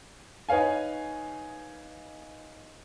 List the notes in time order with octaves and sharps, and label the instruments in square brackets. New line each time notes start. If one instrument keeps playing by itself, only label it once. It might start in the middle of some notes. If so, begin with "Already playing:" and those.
[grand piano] D#4 B4 C#5 F5 G#5